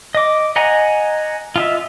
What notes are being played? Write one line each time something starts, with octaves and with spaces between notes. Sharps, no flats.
D#5 D6
D#5 F#5 G#5 A#5
F4 D#5 E5